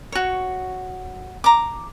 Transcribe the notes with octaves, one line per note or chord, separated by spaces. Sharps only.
F#4 C#5
A#5 D6